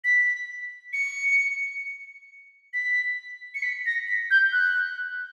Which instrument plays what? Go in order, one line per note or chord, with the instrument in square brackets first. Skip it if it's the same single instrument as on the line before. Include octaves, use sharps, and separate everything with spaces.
[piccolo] B6
C#7
B6
C#7
B6
A#6
B6
G6
F#6